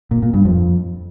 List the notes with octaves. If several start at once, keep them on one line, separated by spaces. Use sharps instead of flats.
A#2
A#2
G2
F2